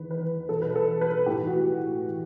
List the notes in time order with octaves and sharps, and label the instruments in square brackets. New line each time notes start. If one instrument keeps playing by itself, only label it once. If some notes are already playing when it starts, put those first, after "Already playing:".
Already playing: [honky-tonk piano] E2 D#3 B4
B4
E2 B2 A4
B4
A4
B4
A2 E3 G4
F#4